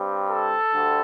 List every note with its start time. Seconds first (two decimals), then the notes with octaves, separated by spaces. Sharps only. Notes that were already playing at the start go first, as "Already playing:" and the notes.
Already playing: G2 G3 C4
0.29 A4
0.73 D2 D3 G3